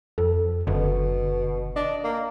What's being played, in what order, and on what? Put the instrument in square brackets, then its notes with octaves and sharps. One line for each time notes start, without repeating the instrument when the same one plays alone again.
[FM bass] F2 [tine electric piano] A4
[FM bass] F#1 [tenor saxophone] B2 [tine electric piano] D3
[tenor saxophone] D4 [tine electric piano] D#5
[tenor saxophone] A#3